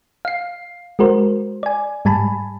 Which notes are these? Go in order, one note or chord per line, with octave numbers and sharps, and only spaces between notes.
F5 C7
G#3 F#4 A#4 C5
D5 G#5
G#2 G3 G#5 A5 B5